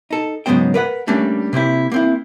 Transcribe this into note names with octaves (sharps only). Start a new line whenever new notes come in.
D#4 A4
G#2 C#3 F#3 B3 C5 G5
A#4 B4 D5 F#5
G3 A3 A#3 C#4 D4
C3 A#3 C4 E4
A#3 C4 E4